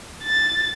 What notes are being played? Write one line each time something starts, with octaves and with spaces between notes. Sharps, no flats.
A6